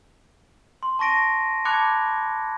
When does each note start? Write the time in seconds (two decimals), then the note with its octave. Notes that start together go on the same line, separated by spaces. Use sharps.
0.83 C6
0.99 A5 C#6 A#6 D7 D#7
1.65 A5 B5 D6 F#6 G#6 C#7